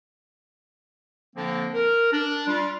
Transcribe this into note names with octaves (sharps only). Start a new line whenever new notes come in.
D3 F3 A#3 C4 D4
A#4
D4
G3 F4